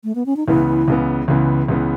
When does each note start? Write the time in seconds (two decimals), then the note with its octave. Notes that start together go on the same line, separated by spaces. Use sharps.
0.04 A3
0.15 B3
0.26 C#4
0.36 D#4
0.47 C#2 C#3 E3 B3 E4
0.88 C#2 C#3 E3 B3
1.28 C#2 C#3 E3 B3
1.68 C#2 C#3 E3 B3